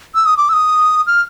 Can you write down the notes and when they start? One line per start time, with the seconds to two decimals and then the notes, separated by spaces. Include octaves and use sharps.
0.15 E6
0.26 D#6
0.38 D6
0.49 E6
0.53 D#6
1.07 F6